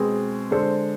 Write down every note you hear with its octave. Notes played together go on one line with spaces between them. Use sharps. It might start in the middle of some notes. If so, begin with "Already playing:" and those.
Already playing: B2 G#3 C4 G#4 B4
D3 G#3 D4 A4 C5